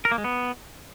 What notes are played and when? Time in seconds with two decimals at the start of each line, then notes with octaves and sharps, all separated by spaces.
0.05 A#4
0.12 A#3
0.18 G#3
0.24 B3